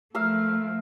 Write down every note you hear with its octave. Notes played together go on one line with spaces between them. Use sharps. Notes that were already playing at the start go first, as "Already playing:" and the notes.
F3 A3 A#4 E5 F5